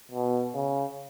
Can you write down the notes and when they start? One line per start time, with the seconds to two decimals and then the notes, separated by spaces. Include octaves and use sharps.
0.12 B2
0.55 C#3